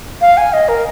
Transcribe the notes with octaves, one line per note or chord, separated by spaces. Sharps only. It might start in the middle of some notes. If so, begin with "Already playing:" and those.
F5
G#5
D#5
A#4